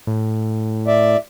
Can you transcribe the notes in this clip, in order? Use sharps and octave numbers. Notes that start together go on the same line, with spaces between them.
A2
D5 E5